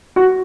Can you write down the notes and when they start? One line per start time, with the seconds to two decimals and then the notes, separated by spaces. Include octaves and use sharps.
0.16 F#4